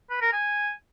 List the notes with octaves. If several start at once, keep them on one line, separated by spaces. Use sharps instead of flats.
B4
A#4
G#5